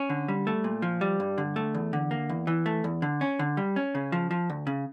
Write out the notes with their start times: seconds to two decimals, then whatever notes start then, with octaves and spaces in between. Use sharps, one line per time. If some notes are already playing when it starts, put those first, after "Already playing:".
Already playing: C#4
0.10 D3
0.28 G3
0.47 A3
0.64 A#2
0.82 F3
1.01 G3
1.20 G2
1.38 D3
1.56 A3
1.75 E2
1.93 D3
2.11 A#3
2.30 E2
2.47 E3
2.66 A3
2.84 E2
3.02 D3
3.21 C#4
3.39 D3
3.57 G3
3.76 C#4
3.95 C#3
4.12 F3
4.31 F3
4.50 D2
4.67 C#3